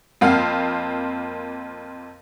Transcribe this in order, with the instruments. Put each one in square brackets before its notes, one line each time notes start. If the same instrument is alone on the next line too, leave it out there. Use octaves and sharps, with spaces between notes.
[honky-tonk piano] F2 A#3 C4 F5